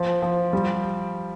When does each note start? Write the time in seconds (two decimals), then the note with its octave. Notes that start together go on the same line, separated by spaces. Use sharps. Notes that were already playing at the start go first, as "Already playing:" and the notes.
Already playing: F3
0.22 F3
0.53 G3